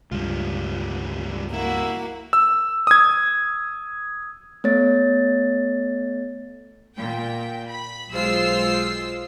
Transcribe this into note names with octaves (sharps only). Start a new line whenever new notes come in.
C#2 G2 G3 F4
A#3 E4 F#4
E6
D#6 G#6
A3 B3 C#5 A6
A#2 G5
B5
B1 G#3 F4 C5 E6 C7